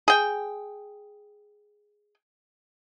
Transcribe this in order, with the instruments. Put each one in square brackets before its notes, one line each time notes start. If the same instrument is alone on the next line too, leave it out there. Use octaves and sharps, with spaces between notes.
[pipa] G#4 G5